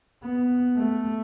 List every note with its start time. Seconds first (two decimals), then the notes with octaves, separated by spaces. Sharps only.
0.23 B3
0.77 A3